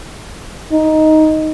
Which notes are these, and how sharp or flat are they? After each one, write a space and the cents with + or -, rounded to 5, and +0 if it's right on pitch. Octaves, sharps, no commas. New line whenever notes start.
D#4 +5